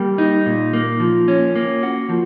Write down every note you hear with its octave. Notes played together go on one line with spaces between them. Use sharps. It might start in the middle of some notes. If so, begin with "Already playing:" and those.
Already playing: G3 A#3
D#4
A#2
A#3
F3
C#4
A#3
F#4
F3